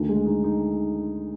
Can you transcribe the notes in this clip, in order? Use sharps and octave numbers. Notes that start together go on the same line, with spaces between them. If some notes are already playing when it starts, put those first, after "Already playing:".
Already playing: D2 D#3
G#3
D#4
D#4